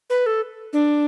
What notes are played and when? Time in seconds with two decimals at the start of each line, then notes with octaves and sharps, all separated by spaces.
0.10 B4
0.26 A4
0.73 D4